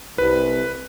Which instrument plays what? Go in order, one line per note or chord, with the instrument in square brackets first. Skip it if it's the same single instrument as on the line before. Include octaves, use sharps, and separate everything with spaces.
[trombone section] C2 [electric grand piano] B4